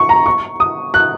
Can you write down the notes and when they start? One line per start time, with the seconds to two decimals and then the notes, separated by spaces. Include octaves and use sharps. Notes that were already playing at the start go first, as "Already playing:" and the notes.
Already playing: C#6
0.09 A#5
0.26 C#6
0.60 D#6
0.94 F#6